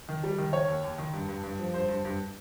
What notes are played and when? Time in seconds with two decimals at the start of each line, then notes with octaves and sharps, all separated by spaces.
0.09 D#3
0.23 G3
0.38 D#3
0.53 D#3 C#5
0.68 D#2
0.84 D#2
0.98 D#3
1.13 G2
1.28 G2
1.43 G2
1.59 F3
1.73 G2 C5
1.89 G2
2.05 G2